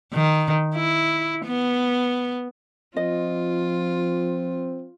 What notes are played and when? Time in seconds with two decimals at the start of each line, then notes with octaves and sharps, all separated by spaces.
0.13 D#3
0.75 E4
1.45 B3
2.96 F3 C4 F4 D#5